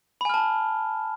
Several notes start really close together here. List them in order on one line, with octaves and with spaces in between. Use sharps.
B5 G#5 F6 A5